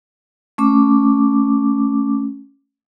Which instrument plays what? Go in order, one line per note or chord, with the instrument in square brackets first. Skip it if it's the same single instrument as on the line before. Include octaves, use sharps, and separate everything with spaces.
[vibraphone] A3 C#4 D6